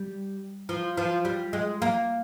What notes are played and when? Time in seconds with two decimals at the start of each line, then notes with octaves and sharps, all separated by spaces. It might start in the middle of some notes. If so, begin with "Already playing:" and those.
Already playing: G3
0.69 F3
0.97 F3
1.25 G3
1.53 G#3
1.82 A#3